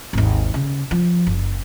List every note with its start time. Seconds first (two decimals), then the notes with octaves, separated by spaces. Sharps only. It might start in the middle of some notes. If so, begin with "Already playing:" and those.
0.13 G#1 D#2
0.54 C#3
0.91 F3
1.26 F#1